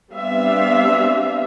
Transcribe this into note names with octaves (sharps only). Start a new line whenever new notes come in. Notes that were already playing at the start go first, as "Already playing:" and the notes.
G3 B3 C4 D4 E5 F5